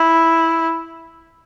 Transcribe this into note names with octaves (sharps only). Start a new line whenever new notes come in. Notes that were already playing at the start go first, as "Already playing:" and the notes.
Already playing: E4